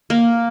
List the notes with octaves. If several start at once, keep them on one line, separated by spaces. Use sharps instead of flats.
A#3